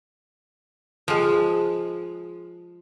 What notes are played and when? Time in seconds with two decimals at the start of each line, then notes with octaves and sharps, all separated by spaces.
1.08 F3 G#3